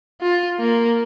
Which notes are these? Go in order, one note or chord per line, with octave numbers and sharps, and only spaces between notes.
F4
A#3